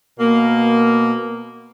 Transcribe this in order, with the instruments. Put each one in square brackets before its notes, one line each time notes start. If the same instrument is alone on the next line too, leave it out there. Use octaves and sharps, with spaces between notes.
[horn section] B2 A#3